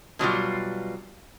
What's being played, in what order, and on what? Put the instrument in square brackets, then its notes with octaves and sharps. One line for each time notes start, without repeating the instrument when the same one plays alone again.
[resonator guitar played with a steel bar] B2 F#3 G3 F4